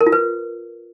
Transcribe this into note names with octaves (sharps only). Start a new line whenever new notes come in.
A#4
F4
B4